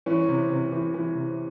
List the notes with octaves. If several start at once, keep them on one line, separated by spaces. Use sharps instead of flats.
E3 C#4
C3
C3
E3
E3
C3